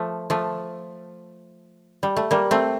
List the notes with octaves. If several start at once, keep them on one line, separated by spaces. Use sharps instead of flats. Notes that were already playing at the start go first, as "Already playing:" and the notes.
Already playing: F3 A3
F3 A3
G3
A3
G3 A#3
A3 C4